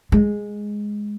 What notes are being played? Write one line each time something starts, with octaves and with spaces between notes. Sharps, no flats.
G#3